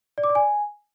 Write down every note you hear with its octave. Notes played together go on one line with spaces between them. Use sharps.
D5
D6
D5
G#5